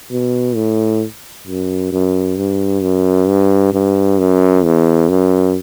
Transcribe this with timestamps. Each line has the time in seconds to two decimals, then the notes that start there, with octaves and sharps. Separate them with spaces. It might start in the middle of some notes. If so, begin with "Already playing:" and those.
0.11 B2
0.56 A2
1.47 F#2
1.92 F#2
2.37 G2
2.83 F#2
3.28 G2
3.73 G2
4.19 F#2
4.65 E2
5.09 F#2